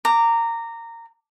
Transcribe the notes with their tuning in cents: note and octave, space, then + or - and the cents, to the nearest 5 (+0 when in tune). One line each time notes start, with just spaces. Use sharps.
A#5 -20 D6 +0